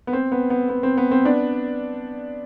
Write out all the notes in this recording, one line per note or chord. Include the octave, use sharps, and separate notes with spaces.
B3
C4
B3
B3
B3
C4
B3
C4
B3 D4